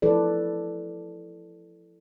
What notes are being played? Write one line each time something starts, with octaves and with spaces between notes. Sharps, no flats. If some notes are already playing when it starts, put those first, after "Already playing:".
F3 E4 A4 B4 D5